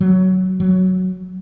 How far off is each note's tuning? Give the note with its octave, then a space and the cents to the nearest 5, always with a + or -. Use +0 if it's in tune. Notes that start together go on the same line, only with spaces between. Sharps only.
F#3 +10
F#3 +0